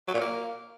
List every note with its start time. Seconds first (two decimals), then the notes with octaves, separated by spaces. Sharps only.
0.08 F#3
0.14 A#2
0.21 A#3